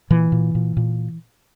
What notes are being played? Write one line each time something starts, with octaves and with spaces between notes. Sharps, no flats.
A#2 E3
A#2
A#2
A#2